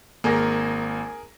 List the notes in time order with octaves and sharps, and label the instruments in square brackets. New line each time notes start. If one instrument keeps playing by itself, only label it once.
[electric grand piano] G#1 A#3 [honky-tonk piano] G#4 A#4 A#6